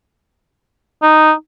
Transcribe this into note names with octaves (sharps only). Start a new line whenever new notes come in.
D#4